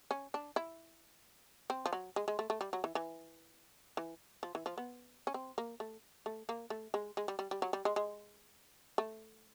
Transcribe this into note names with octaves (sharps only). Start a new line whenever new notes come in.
C#4
D4
E4
C4
F3
F#3
G#3
G#3
A3
A3
G3
F#3
E3
E3
E3
F3
E3
F3
B3
C#4
C4
A#3
A3
A3
A#3
A3
G#3
G#3
G3
G3
G3
F#3
G3
G#3
G#3
A3